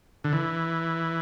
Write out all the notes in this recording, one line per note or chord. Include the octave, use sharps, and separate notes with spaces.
D3
E3